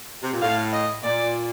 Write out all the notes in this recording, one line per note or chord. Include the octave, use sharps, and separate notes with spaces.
C3
A#2
A2 F5
D#5
A#2 D5